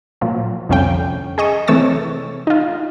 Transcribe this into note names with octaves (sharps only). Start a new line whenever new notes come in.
A#2 F3 F#3
C2 F2 D3 C#4 F5 G5
G#4 D#5 C#6 D#6
C3 E3 A3 C#5 E6 A6
D#4 F4